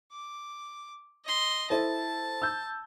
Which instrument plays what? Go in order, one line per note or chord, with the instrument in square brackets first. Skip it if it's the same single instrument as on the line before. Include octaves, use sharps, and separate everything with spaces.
[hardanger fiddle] D6
D#5 C6
[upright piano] E4 A4 C5 [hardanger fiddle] A5
[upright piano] E6 G6